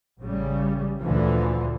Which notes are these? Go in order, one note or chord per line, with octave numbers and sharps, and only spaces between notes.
A1 C#3 G3
D2 A#2 D3 E3 F3